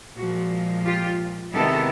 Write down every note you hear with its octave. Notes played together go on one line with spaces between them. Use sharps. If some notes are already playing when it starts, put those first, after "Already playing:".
A#2 F3 G#3 F#4
F4 G4
C3 D#3 G#3 B3 E4 G4 A4